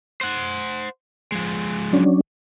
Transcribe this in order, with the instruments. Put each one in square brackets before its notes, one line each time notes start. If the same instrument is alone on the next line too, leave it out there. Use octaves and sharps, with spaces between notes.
[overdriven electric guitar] C5 F#5
F3 G#3
[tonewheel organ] F#3 C#4 D4